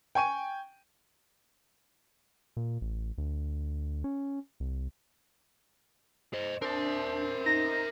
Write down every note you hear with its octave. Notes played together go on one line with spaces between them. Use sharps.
G5 G#5 C#6 D#7
A#2
A1
D2
C#4
C2
C5 D#5
C4 D4 A#4 E5
D#4 A#6